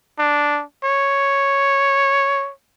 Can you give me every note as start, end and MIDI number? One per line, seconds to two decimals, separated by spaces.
0.19 0.63 62
0.84 2.52 73